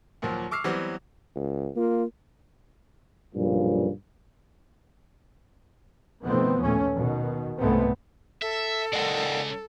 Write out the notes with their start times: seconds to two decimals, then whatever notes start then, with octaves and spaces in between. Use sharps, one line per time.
0.22 D#2 A#2 F3 F#3
0.51 C#6 D6 E6 F6 C7
0.64 E3 F#3 G3 B3 C4
1.36 C#2
1.76 A#3 F4
3.34 B1 G2 A#2 C#3 F3
6.23 B2 D#3 F3 A3 B3 C4
6.60 D#2 A#2 A3 C#4
6.94 B2 D#3
7.59 C2 G#2 G#3 A3 B3 C4
8.42 A4 E5
8.93 C#3 G#3 D5 D#5 F#5